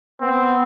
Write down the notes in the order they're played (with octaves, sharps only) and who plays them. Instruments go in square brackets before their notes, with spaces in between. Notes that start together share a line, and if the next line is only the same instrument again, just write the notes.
[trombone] B3 [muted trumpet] C4